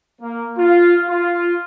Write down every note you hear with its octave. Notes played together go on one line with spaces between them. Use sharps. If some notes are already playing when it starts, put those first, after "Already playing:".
A#3
F4
F4